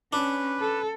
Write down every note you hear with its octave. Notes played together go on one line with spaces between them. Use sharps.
C#4 D4 B4
A4